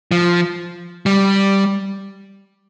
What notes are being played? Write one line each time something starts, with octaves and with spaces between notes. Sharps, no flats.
F3
G3